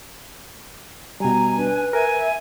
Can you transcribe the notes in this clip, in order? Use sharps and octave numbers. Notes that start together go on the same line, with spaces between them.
B2 G3 G#5 A#5
D4 B4
A#4 E5 G#5